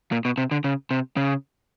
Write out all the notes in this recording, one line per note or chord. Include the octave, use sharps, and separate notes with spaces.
A#2
B2
C3
D3
C#3
C3
C#3